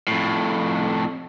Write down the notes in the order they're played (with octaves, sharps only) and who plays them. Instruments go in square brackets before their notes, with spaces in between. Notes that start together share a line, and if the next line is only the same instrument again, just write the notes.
[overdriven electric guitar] F2 A2